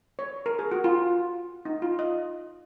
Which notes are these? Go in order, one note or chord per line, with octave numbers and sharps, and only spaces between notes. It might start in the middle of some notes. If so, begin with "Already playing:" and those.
C#5
A#4
G#4
F#4
F4
D#4
F4
D#5